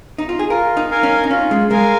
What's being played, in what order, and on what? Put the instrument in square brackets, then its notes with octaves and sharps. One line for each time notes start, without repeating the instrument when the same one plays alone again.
[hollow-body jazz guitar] D#4
F4
G#4
[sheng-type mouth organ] F4 [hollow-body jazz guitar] A#4
[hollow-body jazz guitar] D#4
[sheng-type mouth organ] A#4 F5 G#5
[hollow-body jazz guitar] C#4
D#4
[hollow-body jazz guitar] C#4 [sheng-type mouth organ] F4
[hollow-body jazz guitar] G#3
[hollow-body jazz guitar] G#3 [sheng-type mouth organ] A#4 F5 G#5